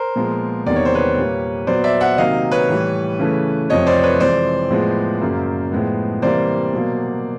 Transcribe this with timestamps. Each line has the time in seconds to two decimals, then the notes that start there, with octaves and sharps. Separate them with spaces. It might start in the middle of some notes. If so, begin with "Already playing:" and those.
Already playing: A#4 C5
0.16 A#2 F3 G#3 B3
0.66 E2 C3 D#3 G3 A#3 D5
0.76 C#5
0.85 C5
0.94 B4 C#5
1.16 A#2 G3 A#3
1.67 A#2 F#3 B3 C5 D5
1.84 D5 E5
2.00 E5 F#5
2.18 C3 D#3 F#3 A#3 D#5 F5
2.51 B4 C#5
2.69 A2 E3 G3
3.19 C#3 E3 A3
3.70 F2 C3 F3 A3 C#5 D#5
3.86 C5 D5
4.03 B4 C#5
4.20 F2 C3 E3 G#3 C5 D5
4.70 A2 F3 G#3 B3
5.21 F#2 C#3 F#3 A#3
5.72 A2 F3 G#3 B3
6.22 C3 E3 G3 A#3 C5 D5
6.73 B2 F#3 A#3